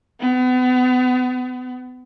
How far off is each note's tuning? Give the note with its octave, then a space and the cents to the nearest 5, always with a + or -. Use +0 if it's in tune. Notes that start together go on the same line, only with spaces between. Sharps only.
B3 +35